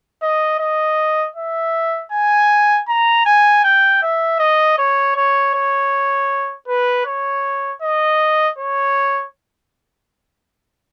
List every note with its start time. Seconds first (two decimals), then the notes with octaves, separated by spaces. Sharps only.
0.22 D#5
0.60 D#5
1.36 E5
2.12 G#5
2.88 A#5
3.26 G#5
3.64 G5
4.02 E5
4.39 D#5
4.78 C#5
5.16 C#5
5.54 C#5
6.68 B4
7.06 C#5
7.82 D#5
8.58 C#5